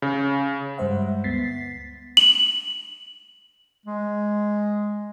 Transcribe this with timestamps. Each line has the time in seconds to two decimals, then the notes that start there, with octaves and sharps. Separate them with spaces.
0.02 C#3
0.78 G2 G3 G#3 C5 E5 F#5
1.24 D2 B3 A6 B6 C7
2.17 F#7
3.86 G#3